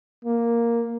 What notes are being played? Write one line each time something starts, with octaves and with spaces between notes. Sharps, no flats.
A#3